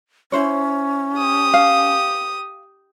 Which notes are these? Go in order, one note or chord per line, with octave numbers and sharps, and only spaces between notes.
C#4 E4 C5 C#5
G4 D#6
F5